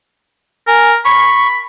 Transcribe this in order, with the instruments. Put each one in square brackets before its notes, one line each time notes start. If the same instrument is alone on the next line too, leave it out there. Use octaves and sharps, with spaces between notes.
[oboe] A#4 [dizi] G#5
[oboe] B5 [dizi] C#6